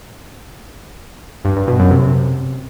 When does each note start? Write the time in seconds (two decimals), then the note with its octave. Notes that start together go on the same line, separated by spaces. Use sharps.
1.45 G2
1.56 G2
1.68 B2
1.80 F#2
1.91 C3